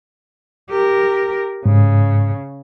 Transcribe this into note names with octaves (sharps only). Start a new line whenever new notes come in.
G4 A#4
G#2 C#3